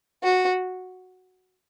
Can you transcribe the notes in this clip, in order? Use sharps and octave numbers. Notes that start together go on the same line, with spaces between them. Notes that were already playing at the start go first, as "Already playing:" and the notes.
F#4